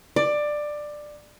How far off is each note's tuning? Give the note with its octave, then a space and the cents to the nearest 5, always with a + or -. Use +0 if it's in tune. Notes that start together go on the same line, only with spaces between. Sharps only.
D5 +15